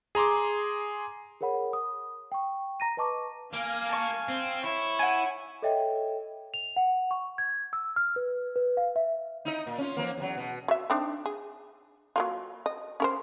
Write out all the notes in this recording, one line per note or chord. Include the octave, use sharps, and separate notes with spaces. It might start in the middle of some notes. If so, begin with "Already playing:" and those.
G#4 A#5 C6 D6
G#4 A#4 C#5 F#5 B5
D#6
G5 C#6
A#5 A#6 D#7
B4 D#5 A5 C#6 D6
A#3 F5 G#5
A5 C#6
C4
E4 C#5
F#5 G#5
A4 C#5 D#5 E5 G5
F7
F#5
C#6
G#6
E6
F6
B4
B4
F5
E5
D#4 E4 D#5
A#2
C#4 F4
E3 F3 A#3
E2 F#3
B2
F#3 E5
C4 D4 D#4
G#4
F#3 A#3 F4
D#5
C#4 A#4 C5